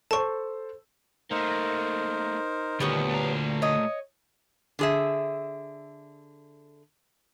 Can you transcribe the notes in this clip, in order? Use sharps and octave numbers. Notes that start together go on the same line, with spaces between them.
A4 C5 A5 C#6
A3 A#3 D#4 A#4 C5
D2 A#2 D#3 G3 B3 C#5
A3 A#5
C#5 D#5
D3 G#4 E5